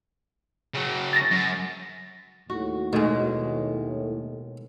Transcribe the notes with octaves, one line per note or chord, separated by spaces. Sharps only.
C#3 F#3
A6 A#6
F#2
D#2 A2 F#4
B2 D#3 G#3 A3 G#4